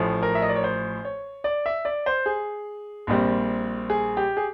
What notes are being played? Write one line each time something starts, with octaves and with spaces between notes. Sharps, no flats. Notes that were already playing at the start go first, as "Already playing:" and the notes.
Already playing: A1 A2 F3
A#4
E5
D#5
D5
C#5
C5
C#5
D5
E5
D5
C5
G#4
A#1 A#2 G3 C4
G#4
G4
G#4